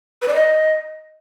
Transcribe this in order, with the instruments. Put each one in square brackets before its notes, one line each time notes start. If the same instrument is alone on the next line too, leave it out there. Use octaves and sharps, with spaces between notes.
[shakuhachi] B4
D5
D#5